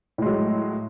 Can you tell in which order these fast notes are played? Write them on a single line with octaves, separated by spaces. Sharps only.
A2 G#3 F#3